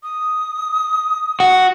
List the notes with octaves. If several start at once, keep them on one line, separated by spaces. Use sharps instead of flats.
D#6
F#4